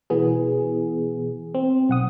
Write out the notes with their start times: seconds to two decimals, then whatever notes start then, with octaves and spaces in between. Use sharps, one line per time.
0.10 B2 E3 B3 G#4
1.55 C4
1.89 B1 F#5 D#6